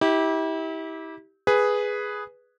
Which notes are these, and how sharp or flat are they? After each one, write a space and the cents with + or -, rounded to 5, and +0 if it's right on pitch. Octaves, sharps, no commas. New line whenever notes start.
E4 -35 G4 -5
G#4 +0 B4 +0